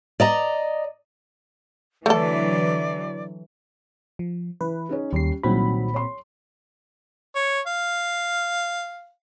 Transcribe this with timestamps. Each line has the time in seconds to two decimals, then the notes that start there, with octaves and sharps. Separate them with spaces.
0.20 D5 D#5 A#5
2.06 D3 E3 F#3 A3 A4 D5
4.19 F3
4.61 E3 B4
4.89 C#4 D#4 G#4
5.13 D#2 G3 C#4 C7
5.43 C2 A#2 D#3 F#3 C4 B5
5.94 C#5 C6
7.35 C#5
7.67 F5